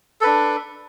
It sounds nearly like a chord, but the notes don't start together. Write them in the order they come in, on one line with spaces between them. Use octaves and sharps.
A4 B4 D4